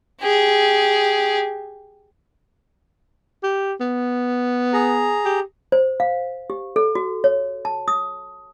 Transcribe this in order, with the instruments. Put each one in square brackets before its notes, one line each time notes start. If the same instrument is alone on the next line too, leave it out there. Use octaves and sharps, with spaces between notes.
[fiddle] G4 G#4
[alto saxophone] G4
B3
[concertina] G#4 A#5
[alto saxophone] G4
[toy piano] C5
F5
G4
A4
F#4
C#5
A5
D#6